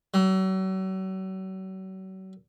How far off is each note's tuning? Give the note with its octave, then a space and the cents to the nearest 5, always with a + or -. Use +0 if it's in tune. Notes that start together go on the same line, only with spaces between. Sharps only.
F#3 +40